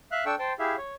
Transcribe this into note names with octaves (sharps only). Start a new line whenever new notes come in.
E5 F5 F#6
D4 A4 G5 C#6 E6
C5 G5 A5 C6
E4 G4 G#4 E5 F5
C#5